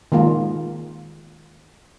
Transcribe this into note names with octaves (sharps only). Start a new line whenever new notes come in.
D#3 G#3 A#3 F4